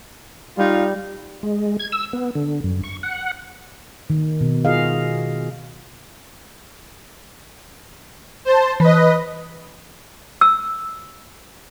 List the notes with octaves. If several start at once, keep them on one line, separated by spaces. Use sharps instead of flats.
G3 D#4 F4
G#3
G#6
E6
B3
D3
F#2
C#6
F#5
D#3
B2
F4 F#4 G#4 D#5 F5
C5 A5
E3 B4 D#5
E6